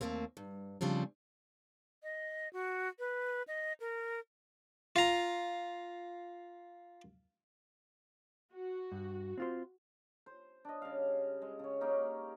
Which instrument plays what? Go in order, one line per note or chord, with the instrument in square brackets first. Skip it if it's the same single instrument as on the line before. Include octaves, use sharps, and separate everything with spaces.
[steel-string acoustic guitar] D#2 G#2 A3 A#3 C4
G2
C#3 F3 G3 C4 D4
[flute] D#5
F#4
B4
D#5
A#4
[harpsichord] F4 A#5
[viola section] F#4
[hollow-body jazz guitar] G2
C4 F4 C5
[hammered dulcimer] C5
D4 D#5
C#3 G3 F5
G#3
C#3 C#5
A#3 C#4 D#4 G4